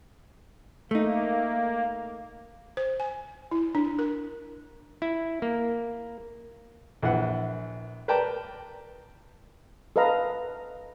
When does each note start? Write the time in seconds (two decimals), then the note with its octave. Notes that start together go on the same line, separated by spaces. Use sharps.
0.91 A3 A#3 D#4
2.77 C5
3.00 G#5
3.51 E4
3.75 D4
3.99 A#4
5.02 E4
5.42 A#3
7.02 A#1 E3 F#5
8.08 A#4 B4 D5 G5 A5 A#5
9.96 A4 B4 D#5 F5 A#5